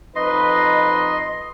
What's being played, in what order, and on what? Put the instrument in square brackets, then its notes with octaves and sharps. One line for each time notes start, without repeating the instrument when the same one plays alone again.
[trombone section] F2 D#4 B4 [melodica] D#5 C6